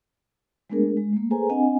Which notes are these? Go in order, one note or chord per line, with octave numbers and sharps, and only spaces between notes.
G#3 A3 B3 D4 G#4 A#4
G#3
A3 A#3
G#4 A4 B4 C5 G#5 A#5
C4 D4 D#5 F#5 G#5